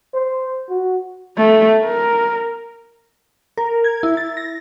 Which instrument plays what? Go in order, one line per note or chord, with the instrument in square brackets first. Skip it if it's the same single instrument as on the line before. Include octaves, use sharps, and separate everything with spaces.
[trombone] C5
F#4
[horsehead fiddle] A3
A#4
[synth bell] A#4
G#6
E4
A6
A#6